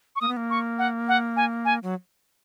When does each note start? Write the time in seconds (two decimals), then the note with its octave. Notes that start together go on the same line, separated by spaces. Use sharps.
0.16 C#6
0.21 A#3 D#6
0.28 B3
0.37 A#3
0.50 C#6
0.78 F#5
1.08 F#5
1.36 G#5
1.65 G#5
1.83 F#3